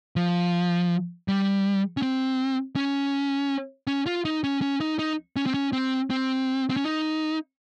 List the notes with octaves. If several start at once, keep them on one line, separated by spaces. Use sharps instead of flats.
F3
G3
C#4
C4
C#4
C#4
F4
D#4
C#4
C#4
D#4
D#4
C#4
C4
C#4
C4
C4
C4
C#4
D#4